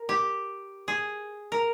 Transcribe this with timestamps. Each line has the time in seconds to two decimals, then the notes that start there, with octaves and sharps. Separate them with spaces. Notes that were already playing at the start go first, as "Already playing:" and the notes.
Already playing: A#4
0.09 G4
0.88 G#4
1.52 A#4